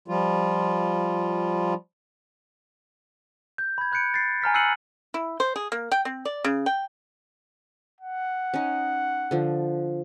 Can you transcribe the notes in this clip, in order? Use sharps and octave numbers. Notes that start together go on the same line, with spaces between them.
F3 G3 F4
G6
B5 G#6
B5 F#6 G6 C#7 D7
A6 C7
G#5 A#5 F6 B6
E6 F#6 C7 C#7 D#7 F#7
E4
C5
G#4
A#3
G5
C4
D5
C#3
G5
F#5
C#4 D#4
D3 F3